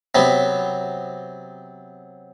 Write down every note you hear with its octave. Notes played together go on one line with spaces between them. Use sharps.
C3 F#3 B3